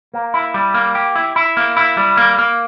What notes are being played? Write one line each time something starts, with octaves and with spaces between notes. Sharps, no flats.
A#3
E4
G3
A#3
G4
E4
E4
A#3
E4
G3
A#3
A#3